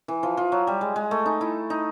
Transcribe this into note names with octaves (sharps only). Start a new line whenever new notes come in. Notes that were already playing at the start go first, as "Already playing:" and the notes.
E3
F3
F3
F#3
G3
G#3
G#3
A3
D#4
E4
D#4